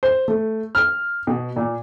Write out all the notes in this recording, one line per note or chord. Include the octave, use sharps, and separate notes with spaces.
C5
A3
F6
B2
A#2